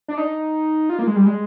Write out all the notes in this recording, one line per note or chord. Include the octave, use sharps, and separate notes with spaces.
D4
D#4
F4
A#3
G#3
G3
G#3